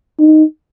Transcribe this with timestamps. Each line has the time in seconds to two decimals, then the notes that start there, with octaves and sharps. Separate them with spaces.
0.20 D#4